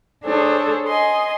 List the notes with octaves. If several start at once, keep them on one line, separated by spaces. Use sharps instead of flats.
D4 G#4 A4 C5 C#5
D#5 G#5 C6